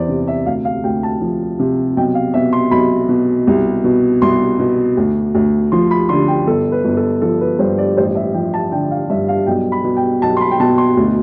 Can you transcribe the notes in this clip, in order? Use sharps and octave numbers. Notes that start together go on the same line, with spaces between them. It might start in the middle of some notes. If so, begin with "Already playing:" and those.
Already playing: E2 E3 C5 D5
C3
E5
D2 F5
F5
D2 G5
A5
F3
C3
B1 G5
F5
B2 E5
C6
B1 B5
B2
C2
B2
C2 C6
B2
D2
D2
F3 C6
B5
D3 C6
G5
G1 A4
B4
G1
A4
F3 A4
B4
G2 C5
D5
A1 C5
E5
F3 G5
A5
D3 G5
F5
G2 E5
F5
B1 G5
B5
B2
G5
B1 A5
C6
B5
G5
B2 A5
C6
D2